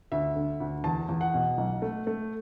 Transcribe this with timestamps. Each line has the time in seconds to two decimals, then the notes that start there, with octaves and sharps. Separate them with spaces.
0.12 D2 E5
0.36 D3
0.60 D2
0.84 E2 A5
1.09 E2
1.21 F#5
1.34 B2
1.58 B1
1.82 A3
2.07 A3